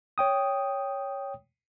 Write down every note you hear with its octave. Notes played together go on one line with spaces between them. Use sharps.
C#5 G5 D#6